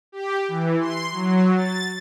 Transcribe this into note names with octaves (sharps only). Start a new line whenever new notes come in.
G4
E3
C6
F#3
A6